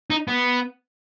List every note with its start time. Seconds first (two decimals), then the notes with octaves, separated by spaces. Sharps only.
0.10 D#4
0.28 B3